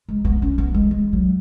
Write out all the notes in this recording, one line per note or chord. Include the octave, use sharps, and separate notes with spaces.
G#3
B3
C#4
B3
G#3
G#3
F#3